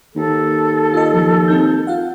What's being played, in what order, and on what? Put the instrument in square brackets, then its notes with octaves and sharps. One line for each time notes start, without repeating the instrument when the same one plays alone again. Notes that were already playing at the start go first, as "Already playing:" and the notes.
[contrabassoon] D#2 [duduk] A4
[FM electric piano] F4 D#5
F3
C4 D#4 G6
F4 F5 F#5